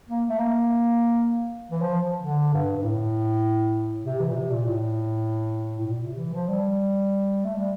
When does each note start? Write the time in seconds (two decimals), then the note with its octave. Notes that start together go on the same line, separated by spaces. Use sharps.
0.09 A#3
0.28 A3
0.39 A#3
1.71 E3
1.81 F3
2.22 D3
2.53 G2
2.76 G2
2.83 A2
4.04 C3
4.19 E3
4.30 A#2
4.35 C3
4.50 A#2
4.65 A2
5.79 A2
5.87 A#2
6.02 C3
6.17 E3
6.32 F3
6.48 G3
7.44 A3
7.57 G3